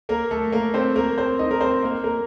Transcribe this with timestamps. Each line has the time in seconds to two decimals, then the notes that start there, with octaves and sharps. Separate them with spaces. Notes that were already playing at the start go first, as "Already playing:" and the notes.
0.09 A#3 A#4
0.31 A3 A4
0.52 A#3 A#4
0.74 C4 C5
0.96 A#3 A#4
1.18 C4 C5
1.39 D#4 D#5
1.51 A#4
1.61 C4 C5
1.82 A#3 A#4
2.04 A#3 A#4